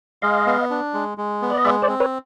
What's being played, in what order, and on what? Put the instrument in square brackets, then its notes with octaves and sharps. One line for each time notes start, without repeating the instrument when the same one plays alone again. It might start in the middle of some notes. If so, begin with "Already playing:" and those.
[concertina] G#3 [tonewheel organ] D#5 F5
[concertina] B3
D4
G#3
G#3
B3
[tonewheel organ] D5
D#5
[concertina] G#3 [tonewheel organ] D5 E5
[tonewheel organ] C5 D5
[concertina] C4
[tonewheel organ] B4 C#5